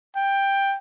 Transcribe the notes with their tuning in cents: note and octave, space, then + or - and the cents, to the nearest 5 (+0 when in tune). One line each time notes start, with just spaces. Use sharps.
G5 +10